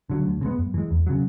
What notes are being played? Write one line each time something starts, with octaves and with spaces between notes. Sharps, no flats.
D3 F#3
D2
C#3
G#3 B3
F#2
E3 G#3
E2
C#3 F#3